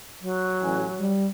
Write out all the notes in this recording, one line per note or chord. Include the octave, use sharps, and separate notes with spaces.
F#3
A1 G#5
G3